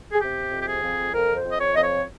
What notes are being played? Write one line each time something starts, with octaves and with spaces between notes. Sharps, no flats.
G#4
C3 G4
F2
G4
G#4
F2
F2 A#4
C5
F2
D#5
C#5
F2 D#5
C#5